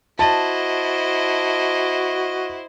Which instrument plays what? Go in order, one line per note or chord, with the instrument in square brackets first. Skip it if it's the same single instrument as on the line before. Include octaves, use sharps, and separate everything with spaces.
[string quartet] E4 C5 [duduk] F#4 [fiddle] D#5 [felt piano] A5